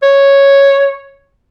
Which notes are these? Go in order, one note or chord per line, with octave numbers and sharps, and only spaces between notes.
C#5